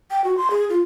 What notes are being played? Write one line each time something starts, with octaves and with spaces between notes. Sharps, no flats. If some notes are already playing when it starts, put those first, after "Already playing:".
G5
F#4
C6
G#4
F4